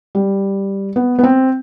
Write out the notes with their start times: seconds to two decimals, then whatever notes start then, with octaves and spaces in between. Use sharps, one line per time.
0.15 G3
0.96 B3
1.19 B3
1.23 C4